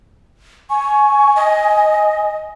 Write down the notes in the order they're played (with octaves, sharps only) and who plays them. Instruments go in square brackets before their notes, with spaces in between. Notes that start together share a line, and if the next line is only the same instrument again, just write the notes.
[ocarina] G#5 [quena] C#6
[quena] D#5